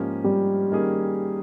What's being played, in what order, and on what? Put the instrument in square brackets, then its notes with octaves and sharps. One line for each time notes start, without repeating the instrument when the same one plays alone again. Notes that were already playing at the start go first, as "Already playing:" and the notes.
Already playing: [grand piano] G#2 F3 A#3 C#4 G4
[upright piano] G3
[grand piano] D#3 A#3 C#4 G#4